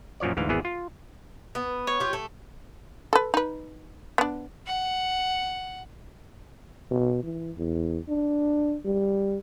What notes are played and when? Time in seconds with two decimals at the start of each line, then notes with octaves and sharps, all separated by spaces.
0.20 F#2 A#2 F3 C#5 D5
0.37 D2 G#2 E3 F5
0.49 G#1 E2 E3 B3 G#4
0.65 F4
1.55 B3
1.87 C#5
2.00 F4 G4
2.13 A3
3.13 A4 B4
3.34 D#4 B4
4.18 B3 D4
4.66 F#5
6.91 B2
7.23 E3
7.57 E2
8.08 D4
8.85 G3